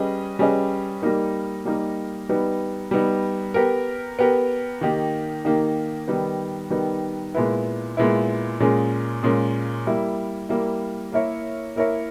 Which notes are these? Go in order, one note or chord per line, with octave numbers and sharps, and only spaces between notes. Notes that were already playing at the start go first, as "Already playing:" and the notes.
Already playing: G3 C#4 G#4 B4 D#5
G3 C#4 G#4 B4 D#5
G3 A#3 D#4 A#4
G3 A#3 D#4 A#4
G3 B3 D#4
G3 B3 D#4
B3 G4 A#4
B3 G4 A#4
D#3 A#3 D#4 G4
D#3 A#3 D#4 G4
D#3 G3 B3 D#4
D#3 G3 B3 D#4
A#2 G#3 B3 E4
A#2 G#3 B3 E4
A#2 G#3 C#4 G#4
A#2 G#3 C#4 G#4
G3 A#3 E4
G3 A#3 E4
A#3 E4 A#4 C#5 E5
A#3 E4 A#4 C#5 E5